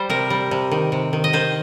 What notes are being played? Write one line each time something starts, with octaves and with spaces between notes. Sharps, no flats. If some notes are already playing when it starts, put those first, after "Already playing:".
Already playing: G3 C5
C3 A#4
G3
C3
D#3
C3
D#3
D#5
D#3 C5